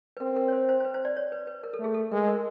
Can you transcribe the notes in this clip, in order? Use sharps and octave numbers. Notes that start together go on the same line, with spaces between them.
B4
C4 A#4
A#4
C#5
C5
C5
C5
B4
C5
D5
C#5
B4
B4
A#4
A4
A3 G#4
A4
G#3 A#4
A#4